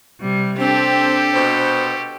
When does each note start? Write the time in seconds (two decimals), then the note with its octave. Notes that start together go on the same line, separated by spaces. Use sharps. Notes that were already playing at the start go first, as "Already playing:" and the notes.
0.20 C3 G3
0.59 C4 D4 G4 A4
1.33 B2 C5